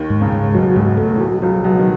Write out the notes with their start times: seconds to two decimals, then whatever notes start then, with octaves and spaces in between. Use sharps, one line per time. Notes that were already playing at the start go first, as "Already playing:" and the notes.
Already playing: D#2 D#3
0.10 G#2
0.21 C#2 C#3
0.32 G#2
0.54 B1 B2 F#3
0.76 B1 G#2 B2
0.98 A3
1.16 A2
1.20 B1 B2 F#3
1.42 C#2 C#3 F#3
1.64 B1 B2 F#3
1.79 D#3